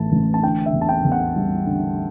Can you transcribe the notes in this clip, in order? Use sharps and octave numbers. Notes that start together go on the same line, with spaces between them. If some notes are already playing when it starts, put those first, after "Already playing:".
Already playing: A1 A2 E3 A5
A1
A5
D3 G5
E5
E2
A5
G5
E2
F#5
G3
D3